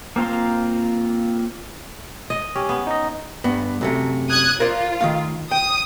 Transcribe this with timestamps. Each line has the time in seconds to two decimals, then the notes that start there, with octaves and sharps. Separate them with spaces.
0.16 A#3 C4 F4 A#5 C6
2.30 D#5
2.56 C#4 G4
2.69 B3
2.87 D#4 D#5
3.44 G2 B3
3.81 F#2 C3 A3
4.29 D#6 F#6 G#6
4.60 F4 A#4 C5 D5
5.01 D#3 A3 F5
5.51 G5 D#6